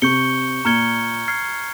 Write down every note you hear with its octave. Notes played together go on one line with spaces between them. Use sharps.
C3 C#6 G6 C#7 G7
A#2 A#5 F6 G#6 C#7 G7
F6 G#6 C7